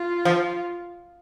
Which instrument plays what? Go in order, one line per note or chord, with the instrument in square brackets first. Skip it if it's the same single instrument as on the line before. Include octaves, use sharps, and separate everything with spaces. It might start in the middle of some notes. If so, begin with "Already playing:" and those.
Already playing: [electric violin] F4
[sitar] F3